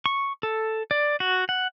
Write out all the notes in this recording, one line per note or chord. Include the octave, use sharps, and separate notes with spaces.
C#6
A4
D5
F#4
F#5